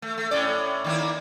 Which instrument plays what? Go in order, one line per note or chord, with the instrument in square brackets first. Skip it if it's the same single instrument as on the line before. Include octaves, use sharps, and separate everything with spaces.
[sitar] A3
A3
A2 C#4 D5
D#3 A#3 E4